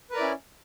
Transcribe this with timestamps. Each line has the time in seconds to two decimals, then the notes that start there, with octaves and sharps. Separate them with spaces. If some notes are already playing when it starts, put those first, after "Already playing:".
0.11 B4
0.13 A#4
0.16 D5
0.19 E4
0.22 C#4